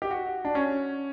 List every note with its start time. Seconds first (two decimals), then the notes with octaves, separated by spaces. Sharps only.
0.02 G4
0.11 F#4
0.45 D4
0.55 C#4